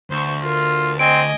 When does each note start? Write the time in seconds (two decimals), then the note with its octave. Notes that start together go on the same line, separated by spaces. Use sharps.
0.10 D2 C5 C#6
0.43 F4 A#4
0.99 C4 D#5 G#5 D7